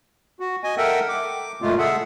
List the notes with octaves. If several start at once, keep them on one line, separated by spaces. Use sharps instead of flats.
F#4
D#5 G#5
A4 A#4 E5 F#5 G5
D6
F#2 A#2 C#3 G#3 A3 F4
G#4 A4 E5 F#5